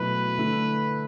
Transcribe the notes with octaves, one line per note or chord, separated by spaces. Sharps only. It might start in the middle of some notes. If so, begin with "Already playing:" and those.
Already playing: B2 F#3 A3 E4 B4
D3 A3 E4